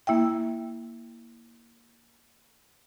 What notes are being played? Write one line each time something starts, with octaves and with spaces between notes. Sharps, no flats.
A#3 E4 E5 G5